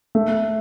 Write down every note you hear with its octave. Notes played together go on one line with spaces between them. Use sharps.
A3